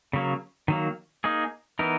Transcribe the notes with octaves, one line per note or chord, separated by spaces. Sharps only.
C#3 F#3 A#3
D#3 F#3 A#3
A#3 D#4 G#4
E3 B3 D#4 A#4